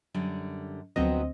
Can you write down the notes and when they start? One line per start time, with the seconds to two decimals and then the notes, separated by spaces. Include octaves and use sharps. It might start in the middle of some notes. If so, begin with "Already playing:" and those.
0.14 F#2 D3 G3
0.96 D2 F3 F#3 B3 C4 D#5